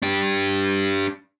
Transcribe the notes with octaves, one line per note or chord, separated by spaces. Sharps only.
D4 G4